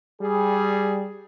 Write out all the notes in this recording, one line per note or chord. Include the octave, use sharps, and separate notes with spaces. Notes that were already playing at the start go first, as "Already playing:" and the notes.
G3 G#4